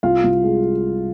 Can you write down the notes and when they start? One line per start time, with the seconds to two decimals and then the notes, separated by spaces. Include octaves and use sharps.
0.03 C2 F4 F5
0.24 C2
0.43 G#3